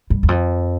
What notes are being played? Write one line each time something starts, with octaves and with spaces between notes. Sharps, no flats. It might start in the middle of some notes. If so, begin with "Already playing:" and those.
G2
E2
F2